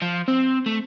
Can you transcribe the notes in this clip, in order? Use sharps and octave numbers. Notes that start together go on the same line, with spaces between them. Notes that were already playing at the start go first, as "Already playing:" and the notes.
F3
C4
A3